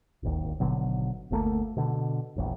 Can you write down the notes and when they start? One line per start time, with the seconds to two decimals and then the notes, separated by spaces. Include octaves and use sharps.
0.23 D1 G#1 D#2
0.60 G#1 B2 D3 F#3
1.31 F#1 D2 A3 A#3
1.77 B2 D3
2.36 E1 A#1 E2